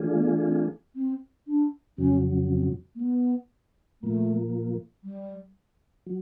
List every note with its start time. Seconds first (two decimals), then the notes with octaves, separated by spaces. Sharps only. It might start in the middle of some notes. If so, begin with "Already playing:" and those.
Already playing: E3 A3 D4 F4 G#4
0.14 A#3
0.19 B3
0.45 C4
0.95 C4
1.47 D4
1.98 F2 C#3 F#3 C#4
2.50 C4
2.95 A#3
3.01 B3
4.02 A#2 F3 A3 A#3
5.04 G3
6.06 F#3